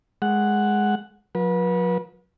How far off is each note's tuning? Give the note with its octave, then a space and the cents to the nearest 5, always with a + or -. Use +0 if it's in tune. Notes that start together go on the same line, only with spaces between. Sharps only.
G#3 +0 F#5 +0
F#3 -45 B4 -30